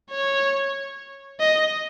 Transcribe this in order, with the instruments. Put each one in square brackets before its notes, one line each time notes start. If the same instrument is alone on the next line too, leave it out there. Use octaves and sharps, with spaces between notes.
[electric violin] C#5
D#5